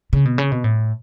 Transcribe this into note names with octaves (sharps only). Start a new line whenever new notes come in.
C#3
B2
C#3
B2
A2